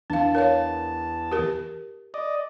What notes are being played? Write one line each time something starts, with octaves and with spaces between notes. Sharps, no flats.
E2 D4 F5 A5
A#4 C#5 F5
G4 A#4
D5 D#5